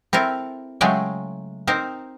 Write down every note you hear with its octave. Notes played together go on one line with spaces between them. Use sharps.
C4 E4 A4 A#4
C#3 F#3 G#3 A3 G5 G#5
C4 D#4 A#4 C5